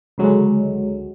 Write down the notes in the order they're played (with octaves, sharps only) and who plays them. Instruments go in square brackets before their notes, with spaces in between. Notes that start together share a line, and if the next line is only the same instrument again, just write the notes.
[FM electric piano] C#2 D3 F#3 G#3